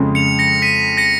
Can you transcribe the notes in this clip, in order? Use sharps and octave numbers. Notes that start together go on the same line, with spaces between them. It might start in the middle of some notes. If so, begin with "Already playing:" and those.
Already playing: F2 C#3 G#3
C#7 F7
A#6 C#7
B6 D#7
A#6 C#7